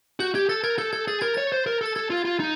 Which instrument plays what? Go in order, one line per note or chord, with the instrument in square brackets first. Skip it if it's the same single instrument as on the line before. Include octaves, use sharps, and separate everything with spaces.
[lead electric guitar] F#4 [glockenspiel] G6
[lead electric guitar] G4 [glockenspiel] G#6
[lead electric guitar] A4 [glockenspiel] A6
[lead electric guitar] A#4 [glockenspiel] G#6
[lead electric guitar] A4 [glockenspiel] G6
[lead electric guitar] A4 [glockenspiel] G#6
[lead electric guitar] G#4 [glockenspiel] A6
[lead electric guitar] A#4 [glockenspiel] G#6
[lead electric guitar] C#5 [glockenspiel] A6
[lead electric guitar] C5
A#4
[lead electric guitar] A4 [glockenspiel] A6
[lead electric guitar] A4 [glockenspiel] G#6
[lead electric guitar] F4
[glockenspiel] G#6
[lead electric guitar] F4
D#4